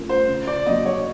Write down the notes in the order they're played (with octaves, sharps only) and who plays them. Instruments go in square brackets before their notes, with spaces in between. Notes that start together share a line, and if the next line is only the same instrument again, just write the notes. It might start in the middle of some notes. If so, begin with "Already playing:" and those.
Already playing: [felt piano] A3 C#4 F4 A#4
[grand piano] C5
[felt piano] C#3
[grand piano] D5
[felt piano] F#3 A#3 [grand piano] D#5
[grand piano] C#5